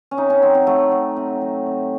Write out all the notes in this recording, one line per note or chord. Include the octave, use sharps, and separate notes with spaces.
C#4
C3 D#4
C#4
F#3 C4
C4
F#3 A3
F#3
C3
F#3
C3